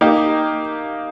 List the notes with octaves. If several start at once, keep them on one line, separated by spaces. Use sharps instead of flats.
A#3 D#4 G4